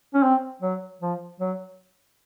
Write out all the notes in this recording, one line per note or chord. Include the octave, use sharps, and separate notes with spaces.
C#4
C4
F#3
F3
F#3